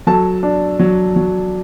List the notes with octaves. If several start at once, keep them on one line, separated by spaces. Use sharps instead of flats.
F#3 A4 A5
D4
F#3
F#3